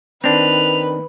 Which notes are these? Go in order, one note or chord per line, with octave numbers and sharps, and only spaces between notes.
D#3 C4 D4 B4 F7